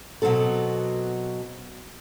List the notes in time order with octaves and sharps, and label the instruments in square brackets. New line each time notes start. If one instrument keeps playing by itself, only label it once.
[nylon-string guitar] B2 F#3 B3 C4 A4